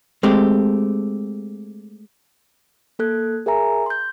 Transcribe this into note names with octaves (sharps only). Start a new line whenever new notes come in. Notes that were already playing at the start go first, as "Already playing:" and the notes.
G#3 A3 C4 G4
A#3 A4 F#6 G#6
G#4 A#4 E5 G#5 A#5
C6 G6